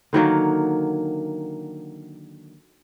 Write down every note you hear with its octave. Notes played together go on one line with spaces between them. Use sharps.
D3 D#3 F#3 A#3